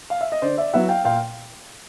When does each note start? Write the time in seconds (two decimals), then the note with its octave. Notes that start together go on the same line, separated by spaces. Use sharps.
0.10 F5
0.21 E5
0.32 D#5
0.42 D3 C5 D5
0.58 D5 E5
0.73 F#3 B3 E4 E5 F#5
0.89 F5 G5
1.05 A#2 F5 G5